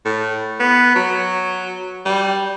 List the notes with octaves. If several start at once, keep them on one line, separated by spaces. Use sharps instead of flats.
A2
B3
F#3
G3